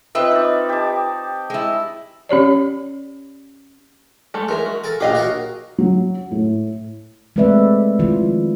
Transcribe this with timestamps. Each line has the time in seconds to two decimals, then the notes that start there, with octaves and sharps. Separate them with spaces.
0.15 C4 D#4 F4 B4 E5
0.31 D#4 D5
0.69 G4 A5
1.50 G#3 E4
2.29 C#4 G4 C#5 D5
4.34 G#3 A3 A4
4.48 E3 G#3 A#4 E5
4.66 F#4
4.84 A4 A#4 G#5
5.00 D2 A#2 G4 G#4 D#5 F5
5.15 F#4 A#4 C#5
5.78 F#3
6.31 A2
7.36 G#3 A3 C4 B4 D5 E5
7.99 D#3 F3 E4 F4